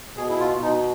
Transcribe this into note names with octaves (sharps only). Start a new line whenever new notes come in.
B2 G#4
E4
F4
B2 D#4